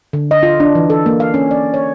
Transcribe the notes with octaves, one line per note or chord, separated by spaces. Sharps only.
D3
D#5
F4
D4
E3
A4
A#3
F5
C#4
D5
C#5